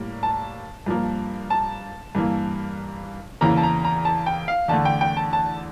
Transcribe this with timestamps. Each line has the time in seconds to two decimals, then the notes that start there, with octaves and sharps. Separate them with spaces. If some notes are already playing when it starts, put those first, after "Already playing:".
Already playing: A2 G3 A#3
0.23 A5
0.86 G2 F3 A#3
1.50 A5
2.15 G2 E3 A#3
3.41 E2 C#3 E3 A#3 A#5
3.57 A5
3.63 A#5
3.85 A#5
4.05 A5
4.26 G5
4.48 F5
4.68 E2 D3 A3 A5
4.85 G5
5.01 G5
5.17 A5
5.33 A5